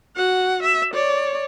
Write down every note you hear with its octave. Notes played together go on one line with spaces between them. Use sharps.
F#4 F#5
E5
C#5 D5